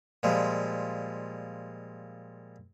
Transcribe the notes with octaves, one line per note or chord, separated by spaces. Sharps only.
A#2 F3 G3 G#3